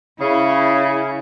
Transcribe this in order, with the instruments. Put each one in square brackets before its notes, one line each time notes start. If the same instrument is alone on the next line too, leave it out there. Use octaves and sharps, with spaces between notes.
[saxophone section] C#3 [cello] E4